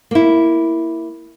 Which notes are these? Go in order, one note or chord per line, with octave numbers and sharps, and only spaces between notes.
A#3 E4